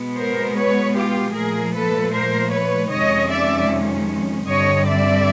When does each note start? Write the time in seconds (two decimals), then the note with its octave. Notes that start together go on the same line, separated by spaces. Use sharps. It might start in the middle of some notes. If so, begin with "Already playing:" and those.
Already playing: B2 G#3 B3
0.17 A#4 C5
0.57 B4 C#5
0.96 F4 G4
1.35 A#2 F3 A3 G#4 A#4
1.74 A4 B4
2.13 A#4 C5
2.52 B4 C#5
2.91 F2 C3 D#3 G#3 C#4 C#5 D#5
3.30 D5 E5
4.47 G2 D3 G3 C4 C#5 D#5
4.86 D5 E5